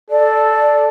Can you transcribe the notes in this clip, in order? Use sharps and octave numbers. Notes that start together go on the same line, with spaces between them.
A4 D5